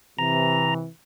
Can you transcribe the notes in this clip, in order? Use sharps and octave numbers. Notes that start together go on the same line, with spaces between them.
C3 E3 A#5